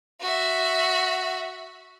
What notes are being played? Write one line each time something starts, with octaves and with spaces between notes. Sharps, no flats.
F#4 E5